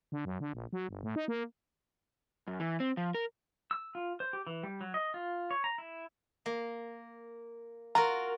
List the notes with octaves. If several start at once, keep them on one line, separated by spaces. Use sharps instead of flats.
D3
F#2
D3
A#1
F#3
G1
A2
D#4
A#3
F#2
E3
C4
F3
A#4
E6
F4
C5
G4
E3
G3
F#3
D#5
F4
C#5
A#5
E4
A#3
F4 F#4 A#4 A#5